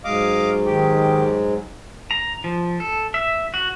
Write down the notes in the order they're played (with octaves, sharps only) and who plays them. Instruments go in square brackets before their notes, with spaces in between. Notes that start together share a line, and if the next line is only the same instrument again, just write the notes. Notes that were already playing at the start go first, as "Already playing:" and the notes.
[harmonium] G#2 F#3 G#3 [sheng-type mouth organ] D#5 F5 D6
[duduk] D#3 [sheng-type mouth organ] G4
[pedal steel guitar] A#5
F3
A4
E5
F#4